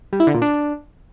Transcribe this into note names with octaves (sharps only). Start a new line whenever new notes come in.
G3
E4
D3
A#2
D4